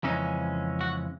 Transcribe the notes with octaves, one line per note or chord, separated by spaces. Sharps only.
F2 C#3 E3 G#3 C#4 D#4
F#4